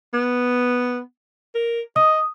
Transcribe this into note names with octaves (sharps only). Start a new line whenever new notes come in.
B3
A#4
D#5 D#6